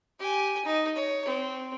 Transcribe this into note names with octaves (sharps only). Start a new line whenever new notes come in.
G4 G#5
D#4
C#5
C4